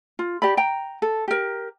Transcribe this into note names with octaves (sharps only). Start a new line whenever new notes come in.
F4
G4 D5 B5
G5 A#5
A4
G4 A#4